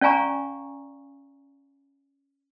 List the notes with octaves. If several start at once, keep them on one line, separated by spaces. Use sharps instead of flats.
C#4 D5 F5 G#5 A#5 C#6